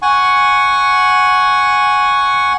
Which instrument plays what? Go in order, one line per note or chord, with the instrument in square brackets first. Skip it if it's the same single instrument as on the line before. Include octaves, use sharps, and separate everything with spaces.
[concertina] F#5 G#5 C#6